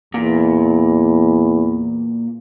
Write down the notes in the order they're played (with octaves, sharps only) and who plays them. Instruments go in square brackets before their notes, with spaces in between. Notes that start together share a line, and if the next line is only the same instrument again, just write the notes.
[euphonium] E2 [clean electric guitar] A#2